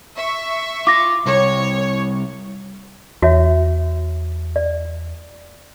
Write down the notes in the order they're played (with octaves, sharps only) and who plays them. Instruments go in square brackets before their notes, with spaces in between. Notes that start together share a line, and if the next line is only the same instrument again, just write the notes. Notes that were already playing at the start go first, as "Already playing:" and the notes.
[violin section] E5 C#6
[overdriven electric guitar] F4 [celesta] D6 A#6
[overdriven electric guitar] C2 [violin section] C#5
[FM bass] E2 [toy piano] F#4 C#5 E5
[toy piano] D5